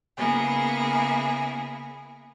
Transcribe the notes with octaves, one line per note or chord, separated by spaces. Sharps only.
C#3 A#3 B3 E4 G#4